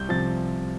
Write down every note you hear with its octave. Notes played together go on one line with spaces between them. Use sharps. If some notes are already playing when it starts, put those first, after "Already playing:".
Already playing: C2 G6
C3 F3 A6